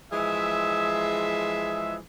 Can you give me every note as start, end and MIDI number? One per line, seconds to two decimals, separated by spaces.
0.12 1.96 52
0.12 1.96 53
0.12 1.96 56
0.12 1.96 68
0.12 1.96 76